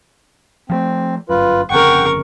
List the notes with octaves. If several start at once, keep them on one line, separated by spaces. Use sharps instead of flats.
F3 F#3 A3 C4
G1 F#2 F4 B4
G1 F2 C#3 A#4 F#5 G5 C#6